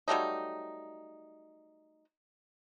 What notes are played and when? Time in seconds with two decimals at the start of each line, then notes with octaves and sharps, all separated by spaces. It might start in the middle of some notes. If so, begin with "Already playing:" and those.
0.08 F#3 G3 A3 D#4